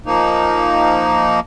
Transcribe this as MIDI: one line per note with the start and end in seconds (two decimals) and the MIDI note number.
0.06 1.40 53
0.06 1.40 58
0.06 1.40 63